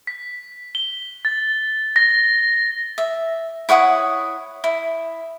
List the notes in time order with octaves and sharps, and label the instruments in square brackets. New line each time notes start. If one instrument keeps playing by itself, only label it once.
[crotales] B6
G7
A6
A#6
[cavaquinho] E5
E4 C#5 F#5 D#6
E4